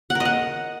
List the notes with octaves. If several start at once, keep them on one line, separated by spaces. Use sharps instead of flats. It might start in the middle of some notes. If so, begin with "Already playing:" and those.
F#5
A#4
D#5
F#5